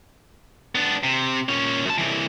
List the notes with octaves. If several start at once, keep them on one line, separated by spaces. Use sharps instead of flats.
B3 D4
C3
A#2 C#4
F#2 A5
C2 E3